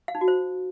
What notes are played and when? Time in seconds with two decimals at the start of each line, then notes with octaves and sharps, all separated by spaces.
0.08 F5
0.15 D#4
0.21 F#4
0.28 C5